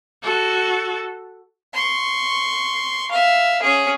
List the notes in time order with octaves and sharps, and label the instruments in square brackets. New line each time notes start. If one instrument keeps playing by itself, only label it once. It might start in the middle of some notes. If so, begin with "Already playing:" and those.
[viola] F#4 A4
[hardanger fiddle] C6 C#6
E5 F5
C#4 G#4